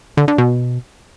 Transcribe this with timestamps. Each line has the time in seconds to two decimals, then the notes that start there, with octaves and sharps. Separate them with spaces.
0.17 D3
0.28 D3
0.38 B2